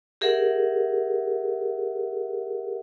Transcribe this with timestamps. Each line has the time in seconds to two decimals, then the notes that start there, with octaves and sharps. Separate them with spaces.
0.21 G4 G#4 A#4 E5 F#5